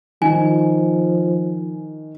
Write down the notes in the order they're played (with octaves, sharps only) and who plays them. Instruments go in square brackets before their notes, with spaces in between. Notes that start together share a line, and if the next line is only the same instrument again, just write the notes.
[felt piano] D#3 [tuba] F3 [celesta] G#5